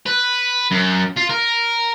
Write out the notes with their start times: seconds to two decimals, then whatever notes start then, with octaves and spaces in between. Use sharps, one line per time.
0.06 B4
0.71 F#2
1.17 F4
1.30 A#4